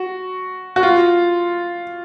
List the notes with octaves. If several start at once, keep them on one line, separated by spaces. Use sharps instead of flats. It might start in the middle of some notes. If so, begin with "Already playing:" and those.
Already playing: F#4
F#4
F4